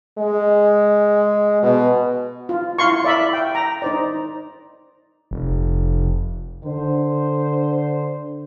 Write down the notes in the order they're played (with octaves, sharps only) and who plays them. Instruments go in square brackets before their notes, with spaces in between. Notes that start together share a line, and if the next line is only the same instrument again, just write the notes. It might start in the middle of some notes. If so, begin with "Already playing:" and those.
[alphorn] G#3
B2
[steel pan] F4
E4 F5 C6 C#6
D5 E5 B5
G5
A#5
D#4 C5 D5
[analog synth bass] F1
[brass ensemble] D3 C5